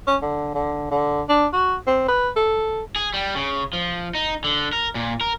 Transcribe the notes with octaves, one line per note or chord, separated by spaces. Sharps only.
C#4
D3
D3
D3
D4
F#4
C4
B4
A4
G#4
G3
C#3
F3
D#4
D3
A#4
A#2
A#4